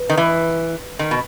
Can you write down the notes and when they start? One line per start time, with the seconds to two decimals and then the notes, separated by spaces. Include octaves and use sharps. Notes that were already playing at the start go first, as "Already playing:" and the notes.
Already playing: B4
0.09 D#3
0.17 E3
0.99 D#3
1.11 B2